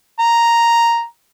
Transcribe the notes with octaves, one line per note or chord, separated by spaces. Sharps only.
A#5